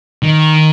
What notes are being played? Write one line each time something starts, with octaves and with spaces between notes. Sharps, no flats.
D#3